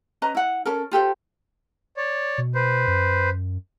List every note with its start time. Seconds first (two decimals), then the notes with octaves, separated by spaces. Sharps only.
0.22 C#4 B4 D#5 A#5
0.35 E4 F#5
0.65 C#4 A4 A#4
0.91 F4 G4 A4 C5
1.97 C#5 D5
2.38 B2
2.55 B4 C5
2.87 F#2